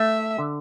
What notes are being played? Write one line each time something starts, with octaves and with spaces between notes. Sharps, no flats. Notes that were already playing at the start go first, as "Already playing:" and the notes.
Already playing: A3 E5
D3